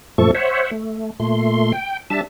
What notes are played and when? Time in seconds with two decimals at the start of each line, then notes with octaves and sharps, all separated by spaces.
0.18 F#2 A#2 F3 A3 A4 C#6
0.35 C5 C#5 E5 F#5
0.71 A3
1.20 A#2 A3 C6
1.73 G5
2.10 G3 D4 E5 A5